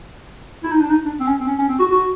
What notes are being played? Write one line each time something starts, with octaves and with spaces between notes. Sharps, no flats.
E4
D#4
D4
D#4
D4
C4
C#4
C4
C#4
C#4
C4
F#4
F#4